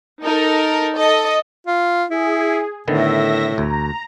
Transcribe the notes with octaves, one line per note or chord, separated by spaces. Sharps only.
D#4 A4 A#4
A4 D#5
F4
E4 G#4
A2 D3 D#3 B3 E5 A#6
D2 A#5